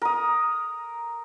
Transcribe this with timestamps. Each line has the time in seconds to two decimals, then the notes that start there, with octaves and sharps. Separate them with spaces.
0.02 A#4 D#6